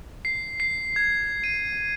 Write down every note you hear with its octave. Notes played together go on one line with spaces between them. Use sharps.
C7
C7
G#6
D#7